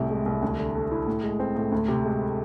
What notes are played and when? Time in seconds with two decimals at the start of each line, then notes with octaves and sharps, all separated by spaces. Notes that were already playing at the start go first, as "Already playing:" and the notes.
Already playing: C2 A2 C3
0.10 G#3
0.26 C2
0.42 D2
0.58 D3
0.75 A3
0.91 E4
1.07 A2
1.23 G#3
1.40 C4
1.56 A2
1.72 D2
1.88 C3
2.04 G#3